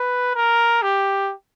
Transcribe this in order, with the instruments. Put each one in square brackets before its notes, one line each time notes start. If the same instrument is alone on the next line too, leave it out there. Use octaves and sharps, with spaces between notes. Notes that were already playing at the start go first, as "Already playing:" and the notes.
Already playing: [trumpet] B4
A#4
G4